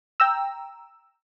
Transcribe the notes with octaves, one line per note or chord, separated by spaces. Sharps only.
G5 A#5 E6